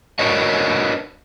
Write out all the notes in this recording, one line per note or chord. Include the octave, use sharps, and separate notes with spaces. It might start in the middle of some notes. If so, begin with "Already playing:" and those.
D4 F#4 A#4 B4 C#5 D#5